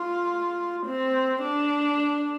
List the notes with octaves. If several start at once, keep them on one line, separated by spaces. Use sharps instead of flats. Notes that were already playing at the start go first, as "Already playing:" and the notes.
Already playing: F4
C4
D4